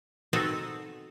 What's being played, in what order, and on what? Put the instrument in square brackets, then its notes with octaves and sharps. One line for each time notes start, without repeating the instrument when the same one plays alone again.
[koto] B2 C4 D#4 F#4 A4